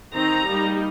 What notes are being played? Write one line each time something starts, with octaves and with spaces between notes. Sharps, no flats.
D#3 C4 D#4 A#5
G3 A#3 D#4